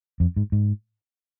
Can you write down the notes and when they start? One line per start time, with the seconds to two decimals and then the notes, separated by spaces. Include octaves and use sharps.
0.20 F2
0.36 G#2
0.52 G#2